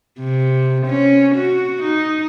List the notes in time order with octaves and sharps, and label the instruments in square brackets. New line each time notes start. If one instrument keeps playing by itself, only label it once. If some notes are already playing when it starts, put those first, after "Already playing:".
[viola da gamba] C3
C#4
F#4
D#4